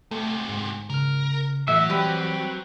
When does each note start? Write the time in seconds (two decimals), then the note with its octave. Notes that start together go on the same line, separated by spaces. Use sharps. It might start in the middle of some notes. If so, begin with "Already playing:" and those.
0.11 D2 C3 A3
0.49 G#2
0.90 C#3 A#4 F6
1.68 A2 E3 F#3 E5
1.90 G3 C4 G4 B4